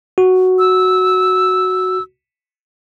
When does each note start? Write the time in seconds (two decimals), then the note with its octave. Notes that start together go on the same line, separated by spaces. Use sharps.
0.18 F#4
0.59 E6